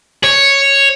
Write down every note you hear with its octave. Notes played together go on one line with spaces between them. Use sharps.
C#5